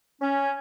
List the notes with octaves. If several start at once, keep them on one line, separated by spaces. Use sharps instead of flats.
C#4